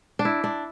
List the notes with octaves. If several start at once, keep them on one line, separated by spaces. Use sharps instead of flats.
D4
E4
D4